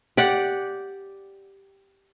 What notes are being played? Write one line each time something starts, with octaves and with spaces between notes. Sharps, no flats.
G4 D5 F#5